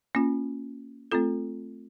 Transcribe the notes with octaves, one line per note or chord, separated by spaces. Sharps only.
A#3 C#4 F4
A3 C4 F4 A4